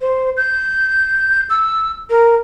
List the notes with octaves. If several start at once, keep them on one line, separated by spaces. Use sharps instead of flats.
C5
G6
E6
A#4